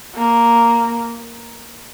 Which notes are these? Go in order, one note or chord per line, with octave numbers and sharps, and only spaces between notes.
A#3